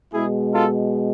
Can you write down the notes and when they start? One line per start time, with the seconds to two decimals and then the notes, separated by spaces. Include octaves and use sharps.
0.13 B2 G#3 E4 G#4
0.53 F4 A4